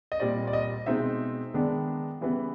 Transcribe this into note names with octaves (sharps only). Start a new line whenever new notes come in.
D#5
A#2 G3 C4 D5
D5
D#5
B2 G#3 C4 D#4 E5
D#3 G#3 B3 D4
C#3 E3 G3 B3